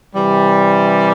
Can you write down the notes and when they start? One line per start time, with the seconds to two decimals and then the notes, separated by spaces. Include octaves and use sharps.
0.15 C3 E3 G3